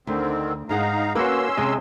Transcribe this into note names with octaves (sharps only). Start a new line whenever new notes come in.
D2 D3 D#3 C4
G#2 D#4 G#4 F5 F#5 A#5
A#3 C#4 F#4 B4 C6 E6
C3 G#3 D#5